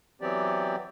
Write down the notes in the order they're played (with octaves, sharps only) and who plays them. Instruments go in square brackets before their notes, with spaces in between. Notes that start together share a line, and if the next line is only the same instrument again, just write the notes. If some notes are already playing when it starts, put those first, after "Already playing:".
[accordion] E3 F#3 B3 C4 G4 D5